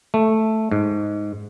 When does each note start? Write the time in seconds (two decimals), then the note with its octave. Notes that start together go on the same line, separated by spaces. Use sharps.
0.14 A3
0.72 G#2